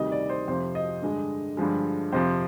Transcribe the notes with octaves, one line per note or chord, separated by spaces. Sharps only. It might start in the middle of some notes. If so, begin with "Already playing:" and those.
Already playing: D2 C3 D#3 G3 D#5
D5
C5
F2 C3 F3 C5
D#5
G2 D3 G#3
G2 D3 F3 G#3
F2 C3 F3 C5